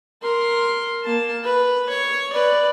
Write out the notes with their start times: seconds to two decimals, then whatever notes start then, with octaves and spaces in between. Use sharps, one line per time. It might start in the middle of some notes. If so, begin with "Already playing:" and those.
0.22 A#4 C6
1.03 A#3 A5
1.44 B4
1.89 C#5
2.33 B4 D5